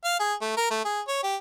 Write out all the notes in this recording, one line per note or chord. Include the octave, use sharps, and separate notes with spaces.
F5
G#4
A3
A#4
A3
G#4
C#5
G4